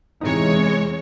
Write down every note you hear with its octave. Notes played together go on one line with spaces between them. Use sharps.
E2 C3 E3 G#3 D#4 C#5
C3